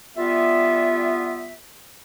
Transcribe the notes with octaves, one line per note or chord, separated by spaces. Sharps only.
G3 B3 F4 E5